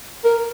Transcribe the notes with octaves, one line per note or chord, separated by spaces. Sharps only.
A#4